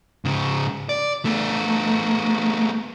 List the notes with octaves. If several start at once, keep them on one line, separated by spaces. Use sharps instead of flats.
G#2 C#3
D5
A3 B3